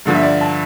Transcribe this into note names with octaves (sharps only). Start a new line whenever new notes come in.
G2 D3 F3
E5
D5
A5